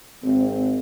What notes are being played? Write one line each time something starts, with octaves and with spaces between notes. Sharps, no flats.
G#1 C4